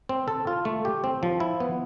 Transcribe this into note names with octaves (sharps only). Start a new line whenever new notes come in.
C4
A4
F4
A3
G4
C4
F3
E4
B3